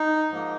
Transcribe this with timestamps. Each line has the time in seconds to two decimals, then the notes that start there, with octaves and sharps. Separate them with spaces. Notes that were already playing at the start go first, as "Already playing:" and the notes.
Already playing: D#4
0.29 G#2 F3 A#3